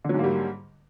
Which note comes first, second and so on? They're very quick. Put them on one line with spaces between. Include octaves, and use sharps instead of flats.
D3 F#3 G#2 A#3 G3